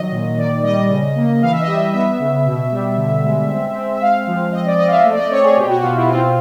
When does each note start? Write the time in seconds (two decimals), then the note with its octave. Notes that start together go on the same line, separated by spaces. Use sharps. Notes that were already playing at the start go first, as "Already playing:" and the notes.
Already playing: D#3 F#3 D#5
0.11 A#2
0.38 D#3 D5
0.63 G3 D#5
0.89 C#3
1.15 A#3
1.42 E3 F5
1.51 E5
1.61 D#5
1.67 G3 E5
1.93 B3 E5
2.19 C#3
2.46 B2
2.72 G3
2.97 D3
3.24 G#3
3.49 C4
3.75 C4
3.94 E5
4.01 G#3 F5
4.27 F3
4.52 C4 D#5
4.66 D5
4.78 C4 D#5
4.87 F5
4.91 E5
5.04 A3
5.11 D5
5.18 D#5
5.30 C4 C#5
5.43 G#4
5.57 B2 G4
5.69 F#4
5.82 B2 F4
5.96 E4
6.08 C4 F4